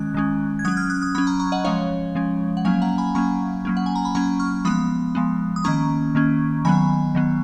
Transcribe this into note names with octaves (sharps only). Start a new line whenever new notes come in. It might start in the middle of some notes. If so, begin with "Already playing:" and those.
Already playing: D#3 G#3 C#4 F#6
D#3 G#3 C#4
G#6
F#3 C#4 D#6 F#6
F6 G#6
D#6 F#6
D#6 F#6
F#3 C#4 B5 D#6
A#5 C#6
A#5 C#6
D#5 F#5
F3 G#3 C#4 C#5 F5
F3 G#3 C#4
F#5
F#3 A#3 C#4 F5 G#5
F#5 A#5
G#5 B5
F#3 A#3 C#4 A#5 C#6
F#3 A#3 C#4
F#5
G#5
A#5
B5
F#3 A#3 C#4 A#5 C#6
C#6 F6
F3 G#3 B3 B5 D#6
F3 G#3 B3
D#6
D#3 A#3 C#4 A#5 C#6
D#3 A#3 C#4
D#3 F#3 B3 G#5 B5
D#3 F#3 B3